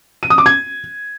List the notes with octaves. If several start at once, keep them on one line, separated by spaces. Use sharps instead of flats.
D#7
D#6
D6
G#6